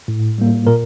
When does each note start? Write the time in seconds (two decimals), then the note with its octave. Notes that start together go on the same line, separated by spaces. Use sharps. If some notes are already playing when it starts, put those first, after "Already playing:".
0.08 A2
0.38 G3 A#3
0.67 A#2 A#4